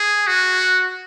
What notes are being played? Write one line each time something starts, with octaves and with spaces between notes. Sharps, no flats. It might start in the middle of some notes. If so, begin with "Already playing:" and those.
Already playing: G#4
F#4